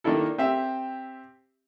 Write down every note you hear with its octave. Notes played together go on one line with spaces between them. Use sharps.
D#3 A#3 D4 E4 A4
C4 G4 E5